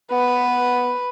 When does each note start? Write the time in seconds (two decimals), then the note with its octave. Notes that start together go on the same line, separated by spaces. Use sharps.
0.12 B3 B4